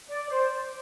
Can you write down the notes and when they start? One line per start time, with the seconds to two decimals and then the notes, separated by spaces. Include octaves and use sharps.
0.09 D5
0.30 C5